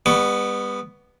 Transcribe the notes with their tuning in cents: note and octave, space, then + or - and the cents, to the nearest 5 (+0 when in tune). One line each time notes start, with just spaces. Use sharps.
G3 +40 B3 +0 C#6 +25